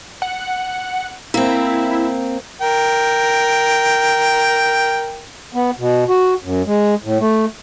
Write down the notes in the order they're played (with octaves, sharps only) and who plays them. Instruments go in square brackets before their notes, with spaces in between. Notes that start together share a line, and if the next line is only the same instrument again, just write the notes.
[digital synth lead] F#5
[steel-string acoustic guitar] A#3 C4 [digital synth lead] E4
[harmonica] A#4 G5
[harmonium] B3
B2
F#4
F#2
G#3
A2
A3